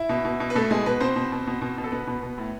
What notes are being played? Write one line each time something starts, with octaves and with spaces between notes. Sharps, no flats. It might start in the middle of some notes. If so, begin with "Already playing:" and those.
Already playing: E4 E5
B2
B2
B2
B4
B2 A3 A4
B2 G#3 G#4
B2 B3 B4
B2 C4 C5
B2
B2
B2
B2
B2
A4
B2 B3 B4
B2
B2
A2